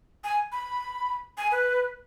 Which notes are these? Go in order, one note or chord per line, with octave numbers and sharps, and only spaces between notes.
G#5
B5
G#5
B4